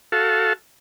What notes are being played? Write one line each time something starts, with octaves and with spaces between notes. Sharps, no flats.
F#4 A4 F5 A5